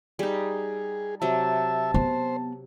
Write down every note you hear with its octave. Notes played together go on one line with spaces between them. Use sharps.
G3 D#4 G#4
C3 F#3 E5 A5
B3 C5